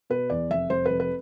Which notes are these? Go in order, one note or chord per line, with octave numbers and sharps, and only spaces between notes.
B2 B4
E2 D5
F1 E5
F1 C5
F1 B4
B4